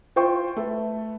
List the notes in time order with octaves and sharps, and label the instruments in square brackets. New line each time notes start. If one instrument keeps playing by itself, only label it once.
[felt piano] F4 C5 G5 C#6
A3 A4 B4